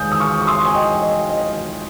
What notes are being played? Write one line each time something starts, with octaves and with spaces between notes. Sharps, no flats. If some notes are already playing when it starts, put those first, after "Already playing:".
Already playing: D#3 G#3 F5 G#5 D#6 G6
D#6
C#6 F6
C#6
C6 D#6
G#5
D#5 G5
D#5
D#5